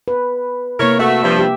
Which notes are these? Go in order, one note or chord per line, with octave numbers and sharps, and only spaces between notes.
B4
C3 A#3 E4 A#4 C#5
A3 F#4 E5
G2 F3
G4